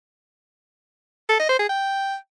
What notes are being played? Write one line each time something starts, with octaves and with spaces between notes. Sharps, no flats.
A4
D#5
C5
G#4
G5